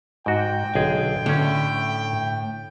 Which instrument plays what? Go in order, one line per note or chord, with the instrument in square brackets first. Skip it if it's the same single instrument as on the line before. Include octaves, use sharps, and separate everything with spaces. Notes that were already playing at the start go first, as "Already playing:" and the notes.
[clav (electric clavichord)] G#2 F#4 [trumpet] G5
[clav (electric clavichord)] B1 G#4 [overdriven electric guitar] D3
[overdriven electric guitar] A2 [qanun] D3 [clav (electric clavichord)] C#4 D4